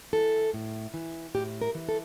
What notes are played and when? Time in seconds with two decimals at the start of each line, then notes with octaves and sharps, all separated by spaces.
0.13 E3 A4
0.54 A2
0.94 E3
1.34 A2 G4
1.61 A#4
1.75 E3
1.89 A4